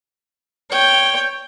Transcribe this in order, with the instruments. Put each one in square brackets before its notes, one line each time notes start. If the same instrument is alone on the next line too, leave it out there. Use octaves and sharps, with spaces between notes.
[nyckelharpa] C#5 G5